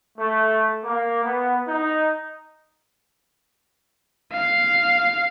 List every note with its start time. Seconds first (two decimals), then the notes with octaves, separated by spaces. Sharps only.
0.18 A3
0.85 A#3
1.24 B3
1.68 D#4
4.33 F5